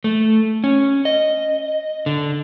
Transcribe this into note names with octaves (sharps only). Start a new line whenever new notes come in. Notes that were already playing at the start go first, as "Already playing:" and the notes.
A3
C#4
D#5
D3